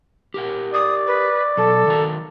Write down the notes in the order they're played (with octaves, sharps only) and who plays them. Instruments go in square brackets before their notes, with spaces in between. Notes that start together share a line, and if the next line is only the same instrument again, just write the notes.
[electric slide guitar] G4 A#4 F#5
[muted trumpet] D5 [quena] D#6
[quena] B4
[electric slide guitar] B2 F#3 [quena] A4
[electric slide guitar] D#3 F#4 A#5